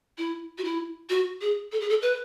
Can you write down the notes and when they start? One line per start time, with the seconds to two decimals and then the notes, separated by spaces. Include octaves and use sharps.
0.18 E4
0.58 F#4
0.64 E4
1.10 F#4
1.41 G#4
1.72 A4
1.80 G#4
1.89 A4
2.02 B4